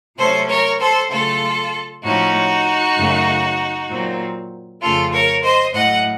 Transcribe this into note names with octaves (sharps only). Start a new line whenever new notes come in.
C3 F#3 A3 C#4 A4 C5
A#4 C#5
A4 C5
C#3 F#3 A3 F4 A4
A2 F3 A3 C#4 D#4 F#4
F#2 C#3 A3
A#2 F#3 C4
F2 C#3 A3 F4 A4
A#4 C#5
C5 D#5
A2 F#3 A3 D#5 F#5